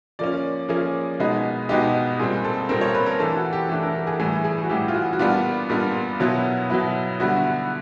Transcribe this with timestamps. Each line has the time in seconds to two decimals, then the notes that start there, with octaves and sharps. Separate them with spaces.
0.19 F3 A#3 C#4 D5
0.69 F3 A#3 C#4 G#4
1.19 B2 G#3 B3 D#4
1.69 B2 G#3 B3 D#4 G4
2.19 A#2 G3 C4 G#4
2.44 A4
2.69 A#2 G3 C4 A#4
2.81 C#5
2.94 B4
3.06 A#4
3.19 E3 A3 D4 A4
3.37 F#4
3.53 G4
3.69 E3 A3 D4 A4
3.83 A#4
3.95 A4
4.07 G#4
4.20 A2 E3 G3 G#4
4.44 G#4
4.64 F#4
4.69 A2 E3 G3 G4
4.88 F4
4.94 F#4
5.13 F#4
5.19 A#2 G3 B3 D4 F4
5.70 A#2 G3 B3 D4
6.20 B2 F#3 B3 E4
6.70 B2 F#3 B3 E4
7.20 D3 G3 B3 E4 F#4
7.37 F#4